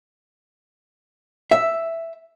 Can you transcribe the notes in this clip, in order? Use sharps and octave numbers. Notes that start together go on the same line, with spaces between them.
E5